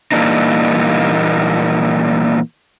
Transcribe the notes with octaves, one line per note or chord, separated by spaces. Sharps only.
A#2 E3 G3 A#3 D4 D#4